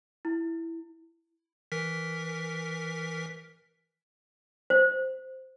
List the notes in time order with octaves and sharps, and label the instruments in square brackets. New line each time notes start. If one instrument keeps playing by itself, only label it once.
[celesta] E4
[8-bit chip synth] E3 A#4 B6
[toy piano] C5